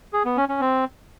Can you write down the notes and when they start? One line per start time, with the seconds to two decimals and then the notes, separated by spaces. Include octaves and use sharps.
0.13 G#4
0.25 B3
0.37 C#4
0.49 C#4
0.61 C4